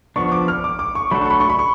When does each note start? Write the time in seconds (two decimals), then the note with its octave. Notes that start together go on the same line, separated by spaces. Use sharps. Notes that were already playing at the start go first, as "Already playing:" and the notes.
0.16 F3 B3 D4 C#6
0.32 D6
0.48 F6
0.64 D6
0.79 D6
0.95 C#6
1.11 F#3 A3 D4 F#4 A4 B5
1.21 C#6
1.30 B5
1.40 C#6
1.50 B5
1.59 C#6